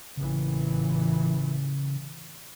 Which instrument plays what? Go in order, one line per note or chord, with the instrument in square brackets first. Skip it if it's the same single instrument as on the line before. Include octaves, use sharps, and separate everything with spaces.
[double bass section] A1 A#2 E3 [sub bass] C#3